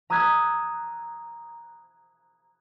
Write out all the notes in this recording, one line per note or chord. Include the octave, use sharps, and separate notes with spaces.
A#5 D#6 E6 F#6 G#6 B6